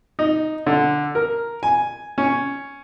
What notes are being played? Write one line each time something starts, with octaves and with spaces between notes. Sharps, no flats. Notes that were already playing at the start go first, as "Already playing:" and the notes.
D#4
D3
A#4
G#5
C#4